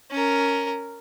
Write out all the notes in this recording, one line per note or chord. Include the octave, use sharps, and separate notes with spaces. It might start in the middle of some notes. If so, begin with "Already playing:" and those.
C#4 A#4